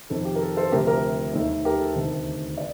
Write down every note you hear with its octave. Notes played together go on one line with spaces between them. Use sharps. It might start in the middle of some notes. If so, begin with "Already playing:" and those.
F2 C3 D#3 A4
G4
A#4
A4
A4 C5
D2 C3 F3 A3 G4 A#4
G4 A#4
D#2 D#3 A3
G4 A#4
A4
D2 C3 D#3
D5